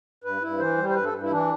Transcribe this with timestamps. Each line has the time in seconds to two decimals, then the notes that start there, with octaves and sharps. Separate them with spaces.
0.24 G2 B4
0.42 G2 E4
0.59 E3 C5
0.78 G3
0.89 C5
0.95 G2 B4
1.04 A4
1.13 G2
1.22 E4
1.31 E3 D4